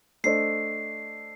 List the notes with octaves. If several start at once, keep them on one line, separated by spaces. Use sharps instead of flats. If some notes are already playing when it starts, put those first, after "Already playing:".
A3 D4 A4 C5 D#5 C7